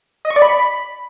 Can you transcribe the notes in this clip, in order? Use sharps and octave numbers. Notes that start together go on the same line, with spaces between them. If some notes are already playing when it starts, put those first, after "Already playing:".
D#5
C#6
D5
B5